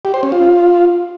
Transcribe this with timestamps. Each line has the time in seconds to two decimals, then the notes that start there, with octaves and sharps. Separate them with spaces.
0.05 G4
0.14 C5
0.23 C#4
0.32 F4